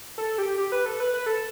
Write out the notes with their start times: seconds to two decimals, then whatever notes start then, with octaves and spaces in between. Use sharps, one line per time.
0.18 A4
0.38 G4
0.58 G4
0.72 B4
0.86 A4
1.00 B4
1.14 B4
1.26 A4